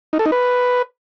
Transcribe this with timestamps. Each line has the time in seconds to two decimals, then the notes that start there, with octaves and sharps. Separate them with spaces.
0.13 D#4
0.19 A4
0.26 D#4
0.32 B4